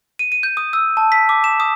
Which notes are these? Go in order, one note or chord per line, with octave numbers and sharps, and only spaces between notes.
D#7
D#7
G6
D#6
E6
A5
B6
D6
E7
D#6